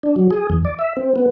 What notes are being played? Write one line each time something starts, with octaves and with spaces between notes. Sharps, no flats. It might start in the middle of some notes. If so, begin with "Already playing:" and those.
D4
F#3
G#4
E2
D5
E5
C4
B3